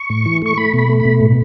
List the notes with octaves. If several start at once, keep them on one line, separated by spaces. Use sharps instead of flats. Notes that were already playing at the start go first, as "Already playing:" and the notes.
Already playing: C#6
A2
E3
A3 C#6
A3 B5
B2 B5
A3
B5
B2
A2